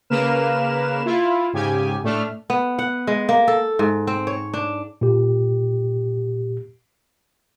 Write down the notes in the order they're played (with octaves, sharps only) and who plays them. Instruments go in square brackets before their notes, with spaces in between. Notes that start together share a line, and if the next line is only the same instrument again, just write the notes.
[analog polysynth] C#3 A#3 A#4 B4 F6 E7
E4 F4
G#2 C#3 G4 G#5
A2 A3 D4 F6
[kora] B3
F#5
G#3
A#3
A4
G#2
C4
C#5
D4
[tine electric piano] A#2 G4